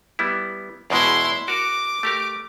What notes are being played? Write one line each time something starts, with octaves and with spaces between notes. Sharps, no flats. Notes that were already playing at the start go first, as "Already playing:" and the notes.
G3 B3 E4
E2 B2 G#3 E4 C6
F#4 A#4 D6
A3 G4 A#4